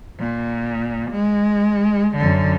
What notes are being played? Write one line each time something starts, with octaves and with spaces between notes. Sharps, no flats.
A#2
G#3
F#2 D3